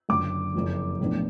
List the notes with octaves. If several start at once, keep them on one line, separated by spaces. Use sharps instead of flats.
F#1 F#2 D3 D6
F#1 F2 F3
B1 A2 F3 B3 D4